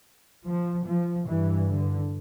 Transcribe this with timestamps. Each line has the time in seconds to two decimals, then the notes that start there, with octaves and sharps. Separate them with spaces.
0.46 F3
0.86 F3
1.26 G2 E3
1.67 D3